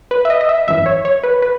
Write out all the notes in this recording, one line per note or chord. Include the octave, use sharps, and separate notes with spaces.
B4
E5
D#5
D#5
E5
G#1 F#2 E3 E5
C#5
C#5
B4
B4